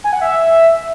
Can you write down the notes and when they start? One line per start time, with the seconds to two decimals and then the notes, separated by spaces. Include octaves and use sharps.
0.04 G#5
0.13 F#5
0.21 E5